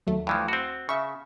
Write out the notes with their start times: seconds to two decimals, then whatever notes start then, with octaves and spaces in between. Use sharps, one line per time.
0.07 D#2 F#3 A3
0.27 G2 E3 F3
0.48 C4 F#4
0.89 C#3 E5 C#6